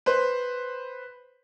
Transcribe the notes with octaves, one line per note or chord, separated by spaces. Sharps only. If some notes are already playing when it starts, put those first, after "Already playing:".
B4 C5